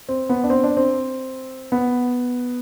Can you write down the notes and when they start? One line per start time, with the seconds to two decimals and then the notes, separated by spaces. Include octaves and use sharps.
0.09 C4
0.30 B3
0.44 D4
0.50 C4
0.63 D4
0.77 C4
1.72 B3